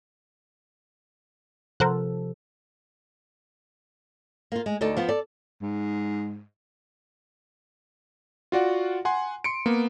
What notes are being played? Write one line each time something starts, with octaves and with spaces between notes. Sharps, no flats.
C3 F3 A4 A#4 C5 F#5
A#3 F4
G#3
D2 D#4 A4 D5
F3 B3 F4
A4 D5
G#2
F4 F#4 D5 F#5
F#5 G#5 C6
C6 C#7 D7
A#3 B3